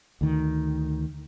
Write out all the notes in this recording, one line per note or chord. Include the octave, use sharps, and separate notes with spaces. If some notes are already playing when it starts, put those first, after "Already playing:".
D2 D#3